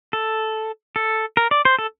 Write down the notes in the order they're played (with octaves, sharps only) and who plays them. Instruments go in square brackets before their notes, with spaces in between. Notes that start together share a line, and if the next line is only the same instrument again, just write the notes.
[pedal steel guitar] A4
A4
A#4
D5
C5
A4